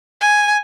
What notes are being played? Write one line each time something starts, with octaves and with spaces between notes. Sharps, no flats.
G#5